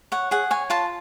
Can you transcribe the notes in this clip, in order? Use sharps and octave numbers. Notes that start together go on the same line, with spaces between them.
C#5 F#5
G#4 F#5
C#5 G#5
F4 A5